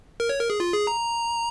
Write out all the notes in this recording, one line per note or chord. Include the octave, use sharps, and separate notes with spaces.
A#4
C#5
A#4
G#4
F4
G#4
A#5